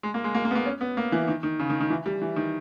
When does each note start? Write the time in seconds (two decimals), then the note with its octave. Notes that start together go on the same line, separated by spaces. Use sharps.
0.03 G#3
0.14 A#3
0.24 G#3
0.34 A#3
0.45 A#3
0.51 B3
0.55 A#3
0.66 C#4
0.81 B3
0.97 A#3
1.12 E3
1.28 D#3
1.43 D#3
1.59 C#3
1.70 D#3
1.81 D#3
1.90 E3
2.06 G3
2.21 E3
2.36 D#3